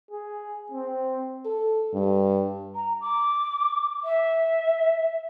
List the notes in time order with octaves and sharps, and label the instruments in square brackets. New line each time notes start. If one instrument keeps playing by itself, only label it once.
[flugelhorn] G#4
C4
[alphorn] A4
G2
[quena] A#5
D6
E5